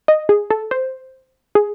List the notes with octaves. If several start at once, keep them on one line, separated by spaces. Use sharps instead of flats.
D#5
G#4
A4
C5
G#4